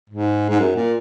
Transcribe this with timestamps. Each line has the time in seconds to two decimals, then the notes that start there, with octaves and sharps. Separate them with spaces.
0.10 G#2
0.50 G#2
0.59 F#2
0.76 A#2